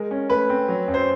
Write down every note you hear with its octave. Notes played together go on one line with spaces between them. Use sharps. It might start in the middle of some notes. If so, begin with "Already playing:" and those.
Already playing: G#3 A#4
C#4
A3 B4
C4
F#3
F#2
C5